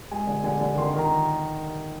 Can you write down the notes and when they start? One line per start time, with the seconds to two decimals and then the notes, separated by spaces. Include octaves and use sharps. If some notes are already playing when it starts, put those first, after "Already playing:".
0.11 G#3 G#5
0.27 D3
0.44 D3 G#5
0.61 D3
0.76 D#3 C6
0.94 D#3
0.99 A#5